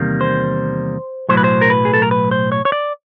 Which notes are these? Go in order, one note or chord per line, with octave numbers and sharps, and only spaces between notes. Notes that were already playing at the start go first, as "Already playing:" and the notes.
Already playing: E2 C3 D#3 G3 A#3
C5
B1 A2 F#3 C5
B4
C5
A#4
B4
G#4
A4
A#4
B4
C5
C#5
C#5
D5